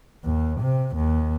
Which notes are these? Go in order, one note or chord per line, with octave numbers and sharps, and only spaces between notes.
D#2
C3
D#2